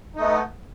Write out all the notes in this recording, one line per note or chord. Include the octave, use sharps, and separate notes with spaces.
A3 B3 D#4